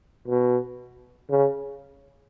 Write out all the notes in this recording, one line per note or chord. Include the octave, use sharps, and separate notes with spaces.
B2
C#3